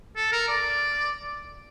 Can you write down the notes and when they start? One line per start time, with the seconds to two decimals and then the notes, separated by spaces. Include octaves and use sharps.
0.16 A4
0.32 A#4
0.49 D5